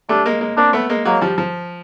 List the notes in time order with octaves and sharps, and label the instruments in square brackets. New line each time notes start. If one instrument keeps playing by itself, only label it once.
[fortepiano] G3 A3 [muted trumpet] D4
[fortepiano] G#3 A#3
G#3 A#3
[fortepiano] A#3 C4 [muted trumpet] D4
[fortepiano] A3 B3
G#3 A#3
[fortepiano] F#3 G#3 [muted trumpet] A#3
[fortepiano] F3 G3
F3